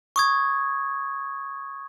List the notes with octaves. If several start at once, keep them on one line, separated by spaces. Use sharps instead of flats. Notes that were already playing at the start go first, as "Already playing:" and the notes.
C#6 D#6 G#6